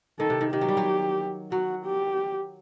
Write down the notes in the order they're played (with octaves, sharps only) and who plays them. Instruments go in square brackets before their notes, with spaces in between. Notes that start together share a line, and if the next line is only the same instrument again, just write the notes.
[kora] D#3 [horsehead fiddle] A4
[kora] C3
D#3
[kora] D#3 [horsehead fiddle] G4
[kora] F#3
G3
F#3
[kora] F#3 [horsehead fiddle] F#4
[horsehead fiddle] G4